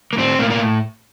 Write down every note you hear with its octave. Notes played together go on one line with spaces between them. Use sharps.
A#3
A2 C4
A2 A#3
A#3